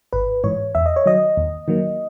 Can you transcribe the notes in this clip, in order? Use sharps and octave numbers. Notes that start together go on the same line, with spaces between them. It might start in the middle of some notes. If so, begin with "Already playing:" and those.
G#1 B4
G#2 E3 C#5
E2 E5
D#5
C#5
D#3 F#3 D#5
D#2
D#3 F#3 A#3